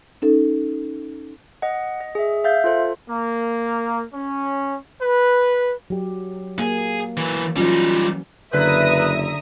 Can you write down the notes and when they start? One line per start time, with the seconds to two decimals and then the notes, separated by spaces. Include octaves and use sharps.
0.22 C#4 D#4 A4
1.62 D#5 F#5
2.01 D#5
2.15 G#4 E5
2.44 E5 F5 G6 A6
2.64 F4 A4 C5
3.09 A#3
4.12 C#4
5.00 B4
5.90 F#3 G4
6.59 A#3 G#4
7.17 E3 F#3
7.57 E3 F#3 G3 C#4 D#4 F4
8.53 F#1 D3 B4 E5 A#5 D#6